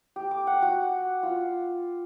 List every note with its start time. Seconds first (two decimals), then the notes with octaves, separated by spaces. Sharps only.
0.16 G4
0.31 D6
0.47 F#5
0.62 F#4
1.23 F4